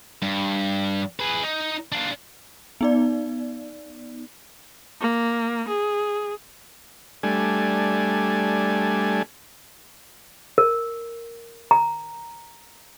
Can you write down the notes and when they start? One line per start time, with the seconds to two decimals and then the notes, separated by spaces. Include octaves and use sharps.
0.22 G2
1.20 G#4 B4
1.43 D#4
1.92 D4 F4
2.81 B3 D#4 D5
5.01 A#3
5.68 G#4
7.23 G3 A3 D4 G#5
10.58 A#4
11.71 A#5